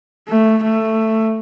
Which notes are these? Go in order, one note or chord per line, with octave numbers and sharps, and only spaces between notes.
A3
A3